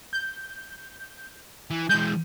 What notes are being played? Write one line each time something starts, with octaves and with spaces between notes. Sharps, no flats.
G6
E3
E3 G#3 G6